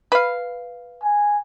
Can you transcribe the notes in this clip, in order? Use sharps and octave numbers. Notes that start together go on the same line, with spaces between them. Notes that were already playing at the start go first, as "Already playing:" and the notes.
B4 F5
G#5